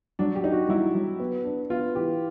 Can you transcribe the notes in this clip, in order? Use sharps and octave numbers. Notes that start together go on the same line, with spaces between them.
F#3 D4
G4
D#4
F#4
F#3 E4
F#3
B3
D4
B3 F4
E3 G4